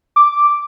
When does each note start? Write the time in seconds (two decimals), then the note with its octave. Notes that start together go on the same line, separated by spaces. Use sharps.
0.16 D6